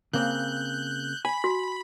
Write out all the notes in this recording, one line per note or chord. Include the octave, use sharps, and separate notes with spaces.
C#3 A#3 C4 F#6 G6
G#5 B5
F#4